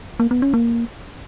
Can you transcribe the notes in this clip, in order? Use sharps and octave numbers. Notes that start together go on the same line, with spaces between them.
A#3
B3
C#4
A#3